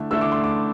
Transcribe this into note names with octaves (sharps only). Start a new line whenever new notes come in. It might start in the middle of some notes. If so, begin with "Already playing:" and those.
Already playing: D3 A3 E4
D3 A3 E4 E6
D6
C6
D6